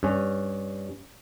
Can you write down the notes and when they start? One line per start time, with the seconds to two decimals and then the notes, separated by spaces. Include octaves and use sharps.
0.03 G2 C#4